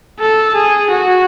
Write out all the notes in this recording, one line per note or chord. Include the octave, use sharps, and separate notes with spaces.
A4
G#4
F#4